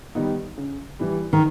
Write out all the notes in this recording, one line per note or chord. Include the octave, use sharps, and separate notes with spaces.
D#3 G3 B3 D#4
C#3
E3 G3
D#3